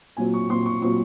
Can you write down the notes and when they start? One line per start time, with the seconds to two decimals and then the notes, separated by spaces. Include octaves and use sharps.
0.17 A#2 F#3 C4 G#5
0.34 C#6
0.49 A#2 F#3 C4 C6
0.66 C#6
0.82 A#2 F#3 C4 C#6